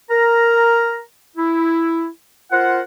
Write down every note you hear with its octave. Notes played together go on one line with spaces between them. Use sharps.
A#4 A#5
E4
F4 A#4 C5 F#5